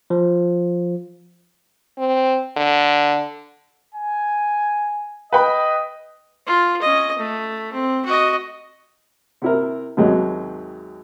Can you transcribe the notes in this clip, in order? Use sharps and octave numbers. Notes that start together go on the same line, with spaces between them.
F3
C4
D3
G#5
B4 D#5 G5 B5
F4
C#4 D#5
A3
C4
F#4 D#5
C3 E4 A#4
D#2 G#2 C3 F#3 G#3 D#5